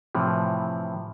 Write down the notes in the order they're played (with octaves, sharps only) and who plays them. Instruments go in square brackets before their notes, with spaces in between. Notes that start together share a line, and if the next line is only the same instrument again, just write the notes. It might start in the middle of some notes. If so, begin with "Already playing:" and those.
[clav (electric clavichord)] A2 C3 E3 F3